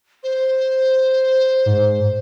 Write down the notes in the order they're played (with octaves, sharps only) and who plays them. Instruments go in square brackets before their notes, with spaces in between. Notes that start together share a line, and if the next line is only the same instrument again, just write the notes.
[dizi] C5
[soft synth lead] G#2